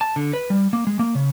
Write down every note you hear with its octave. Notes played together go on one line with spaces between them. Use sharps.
A5
D3
B4
G3
A#3
G#3
A#3
C#3